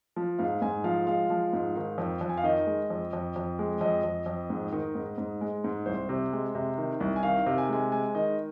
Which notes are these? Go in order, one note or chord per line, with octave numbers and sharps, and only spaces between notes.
F3
G#2 F5
G#2 G#5
F3 F5
G#3 F5
F3
G#2
D#3
F2
F2
G#5
F5
D#3 D#5
G#3
F2
F2
F2
G#3
F2 D#5
F2
F2
G#2
D#3
G#2
G#2
G#3
G#2
C2 C5
C3
G#3
C3
D#3
C2
G#5
D#3 F5
C3
G#5
G#3 G#5
G#3 G#5
D#3 D#5